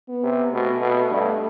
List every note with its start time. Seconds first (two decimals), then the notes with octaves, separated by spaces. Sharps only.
0.09 B3
0.23 C3
0.52 B2 A3
0.81 B2
1.11 G2